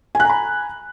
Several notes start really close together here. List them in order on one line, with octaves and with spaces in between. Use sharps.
G#5 F#6 A#5 B5